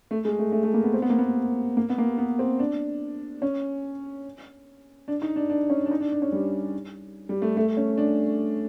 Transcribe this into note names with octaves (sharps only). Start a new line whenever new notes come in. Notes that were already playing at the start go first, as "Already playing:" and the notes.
A3
G#3
A3
A3
A3
A#3
B3
C4
B3
A#3
B3
A#3
B3
A#3
B3
C4
D4
C#4
D4
D#4
D4
D4
C#4
D4
D#4
D4
D4
C#4
G3
G3
A3
A3
C#4
D4